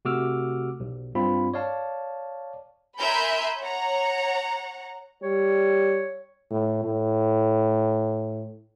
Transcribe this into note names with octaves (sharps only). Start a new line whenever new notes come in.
C3 A3 F#4 D6 E6 F6
B1
G2 C4 F4 B5
C#5 D5 F5 A5
A#4 E5 G#5 B5 C6 G6
C#5 F#5 A#5
G3 C#5
A2
A2